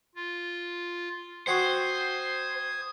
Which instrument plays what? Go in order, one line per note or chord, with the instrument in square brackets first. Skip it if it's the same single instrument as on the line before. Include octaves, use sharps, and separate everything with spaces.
[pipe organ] F4
[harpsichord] C4 F#4 [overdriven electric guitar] C5 [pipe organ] D#6 G#6